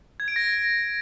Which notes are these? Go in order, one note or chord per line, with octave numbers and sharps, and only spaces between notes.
G#6
D7
A#6